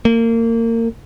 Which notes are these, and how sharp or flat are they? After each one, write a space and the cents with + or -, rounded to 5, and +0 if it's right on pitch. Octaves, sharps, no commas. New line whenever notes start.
A#3 -30